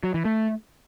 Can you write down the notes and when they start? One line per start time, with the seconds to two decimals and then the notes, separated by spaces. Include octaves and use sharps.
0.03 F#3
0.14 E3
0.25 A3